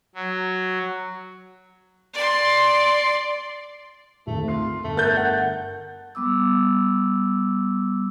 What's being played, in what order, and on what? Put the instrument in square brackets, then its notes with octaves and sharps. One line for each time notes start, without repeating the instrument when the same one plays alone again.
[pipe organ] F#3
[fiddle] D5 C6
[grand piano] G#1 D2 [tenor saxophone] A3
[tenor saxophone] F4 [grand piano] C7
[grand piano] G1 [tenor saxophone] A3
[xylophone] A#4 [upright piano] F#6 G6 A6
[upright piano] F#5
[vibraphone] G3 B3 D6 E6